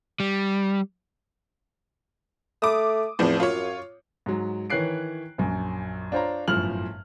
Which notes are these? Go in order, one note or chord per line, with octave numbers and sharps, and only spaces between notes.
G3
A3 D6 D#6
E2 A2 F3 C4
F#2 F4 C#5
G#2 F#3
D#3 E3 C#5 F#6 C7 D7
A#1 F#2
D4 F4 C5 C#5 F5 A#5
G1 F#2 A2 F3 F6 F#7